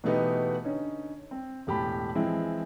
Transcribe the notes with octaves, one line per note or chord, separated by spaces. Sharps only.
B2 E3 A3 B3 D#4 G4
D3 C#4 D#4
C4
E1 A2 G4 A5 B5
E3 F3 G#3 C4 E4